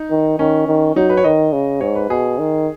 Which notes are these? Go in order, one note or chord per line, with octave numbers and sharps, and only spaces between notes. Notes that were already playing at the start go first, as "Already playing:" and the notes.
Already playing: D#4
D#3
D#3 C#4
D#3
F#3 D#4
B4
C#5
D#3 D#5
C#3
G#2 C#5
B4
B2 G#4
D#3